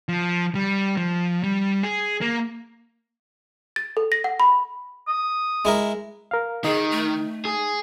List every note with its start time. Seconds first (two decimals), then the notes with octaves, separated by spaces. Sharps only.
0.09 F3
0.55 G3
0.97 F3
1.43 G3
1.83 G#4
2.21 A#3
3.76 A6
3.97 A4
4.12 A#6
4.24 F#5
4.40 B5
5.08 D#6
5.65 G#3 E4 A#4
6.31 A#4 F5
6.65 D#3 D#4 G#4
6.91 A3
7.45 G#4